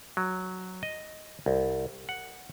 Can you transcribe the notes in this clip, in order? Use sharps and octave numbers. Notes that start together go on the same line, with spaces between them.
F#3
D#5
C2
F#5